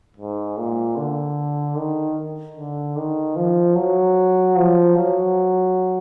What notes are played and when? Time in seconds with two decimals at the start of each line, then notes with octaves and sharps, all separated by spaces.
0.17 G#2
0.57 A#2
0.97 D3
1.76 D#3
2.56 D3
2.97 D#3
3.36 F3
3.76 F#3
4.56 F3
4.96 F#3